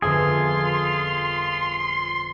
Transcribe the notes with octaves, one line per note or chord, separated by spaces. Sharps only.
G1 F2 F4 G#4 E5 C6